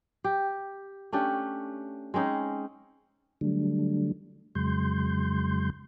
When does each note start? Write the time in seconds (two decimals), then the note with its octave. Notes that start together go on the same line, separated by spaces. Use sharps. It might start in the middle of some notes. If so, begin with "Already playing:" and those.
0.24 G4
1.12 A3 C#4 D4 G4
2.14 G#3 C4 C#4 D#4
3.41 D3 F#3 G3 A3 D4
4.55 F2 C#3 F#3 G#3 C6 G6